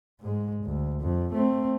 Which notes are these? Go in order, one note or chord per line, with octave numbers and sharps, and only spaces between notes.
G#2 G#3
D2
F2
A3 C4